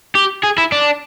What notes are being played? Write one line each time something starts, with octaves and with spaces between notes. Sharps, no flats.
G4
G#4
E4
D4